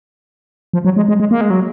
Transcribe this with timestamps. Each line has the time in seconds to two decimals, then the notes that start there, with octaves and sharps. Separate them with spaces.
0.73 F3
0.85 F#3
0.97 G#3
1.08 G#3
1.20 G#3
1.31 A#3
1.41 G#3
1.50 F#3